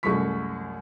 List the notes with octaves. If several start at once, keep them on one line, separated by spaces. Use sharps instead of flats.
C2 F#2 G#3 A3 C#6 B6